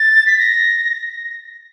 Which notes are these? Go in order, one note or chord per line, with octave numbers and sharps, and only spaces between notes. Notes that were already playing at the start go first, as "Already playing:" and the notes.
Already playing: A6
B6
A#6